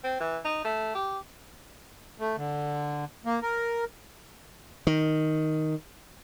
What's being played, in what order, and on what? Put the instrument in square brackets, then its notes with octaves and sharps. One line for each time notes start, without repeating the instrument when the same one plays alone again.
[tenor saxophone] C4
E3
D#4
A3
G4
[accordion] A3
D3
A#3
A#4
[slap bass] D#3